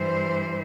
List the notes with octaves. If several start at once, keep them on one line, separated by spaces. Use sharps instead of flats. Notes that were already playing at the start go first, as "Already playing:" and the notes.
Already playing: G2 E3 G3 C5